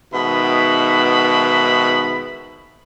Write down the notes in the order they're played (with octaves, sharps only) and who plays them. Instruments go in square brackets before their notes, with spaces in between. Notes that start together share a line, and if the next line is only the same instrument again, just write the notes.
[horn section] G#2 B2 D#3 B3 E5 B5